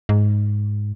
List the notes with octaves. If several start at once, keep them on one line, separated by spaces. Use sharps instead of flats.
G#2